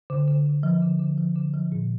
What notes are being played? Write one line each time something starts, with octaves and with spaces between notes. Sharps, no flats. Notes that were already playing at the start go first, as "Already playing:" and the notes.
D3
D3
D3
F3
D3
D3
F3
D3
F3
A#2